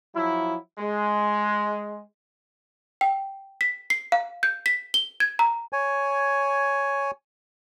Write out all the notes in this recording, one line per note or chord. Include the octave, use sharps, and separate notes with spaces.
F3 F#3 E4
G#3
G5
B6
C7
F5
G6
B6
G7
G#6
A#5
C#5 G#5